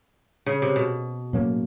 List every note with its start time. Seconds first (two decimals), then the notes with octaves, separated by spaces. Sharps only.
0.46 C#3
0.62 C3
0.76 B2
1.33 A2 F#3 A#3 C#4